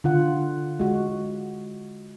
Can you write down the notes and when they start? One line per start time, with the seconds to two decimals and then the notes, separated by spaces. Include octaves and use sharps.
0.04 D3 F4 F#5
0.80 G#3 F#4